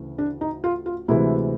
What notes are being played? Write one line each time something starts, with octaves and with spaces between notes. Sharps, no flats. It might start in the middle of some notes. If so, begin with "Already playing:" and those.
Already playing: D2 C#3 E3 A3
D4
D#4
F4
F4
D2 C3 E3 G#3 E4